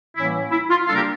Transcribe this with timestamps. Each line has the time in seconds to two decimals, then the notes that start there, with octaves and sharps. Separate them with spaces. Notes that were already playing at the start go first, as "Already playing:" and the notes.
0.16 A2 E3 G3 A#3 C#4 E4
0.51 E4
0.69 F4
0.86 C#3 G3 A#3 D4 F4 A4
0.95 G4 A#4